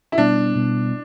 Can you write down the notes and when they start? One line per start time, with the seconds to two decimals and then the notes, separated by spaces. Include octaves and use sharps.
0.12 E4
0.18 B2 G3 B3 D4
0.56 B2 G3 B3